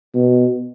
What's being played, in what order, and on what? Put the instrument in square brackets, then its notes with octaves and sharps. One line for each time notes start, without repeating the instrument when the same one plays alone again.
[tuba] B2